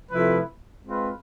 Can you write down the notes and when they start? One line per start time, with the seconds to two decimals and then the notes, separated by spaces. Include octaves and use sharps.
0.10 C3 F3 A3 E4 B4
0.84 G#3 C4 F4 B4